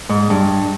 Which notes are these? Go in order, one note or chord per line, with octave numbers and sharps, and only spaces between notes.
G#2
G2